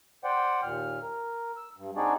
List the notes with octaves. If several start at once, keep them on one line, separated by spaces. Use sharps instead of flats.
C5 D5 F#5 G5
D#2 A#2 F6
A#4
E6
G2
C4 D4 D#4 F#4 G#4 D5